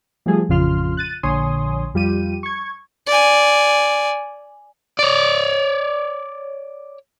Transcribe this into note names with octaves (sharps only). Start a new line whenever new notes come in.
F3 G3 A3 G#4 A4
A1 F2 C#3 F4 C6 F6
F#6 A6 D#7
A#1 D3 C#5 G#5 C6 D#6
F2 G3 F4 G4 D#7
C#6 G#6
D5 G#5
C#5 D5